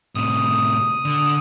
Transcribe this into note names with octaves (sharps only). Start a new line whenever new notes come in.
A2 C3 D#6
D3